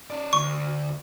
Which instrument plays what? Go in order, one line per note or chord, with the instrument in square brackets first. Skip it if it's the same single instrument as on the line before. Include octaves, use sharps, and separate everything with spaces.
[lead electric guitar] C#4 D5
[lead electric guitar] D2 [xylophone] C#6